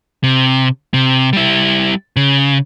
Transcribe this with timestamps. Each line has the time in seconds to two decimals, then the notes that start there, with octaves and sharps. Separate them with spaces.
0.24 C3
0.94 C3
1.33 G3 E4
2.16 C#3